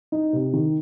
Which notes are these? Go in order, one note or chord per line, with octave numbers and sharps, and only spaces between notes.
D#4
C3
D#3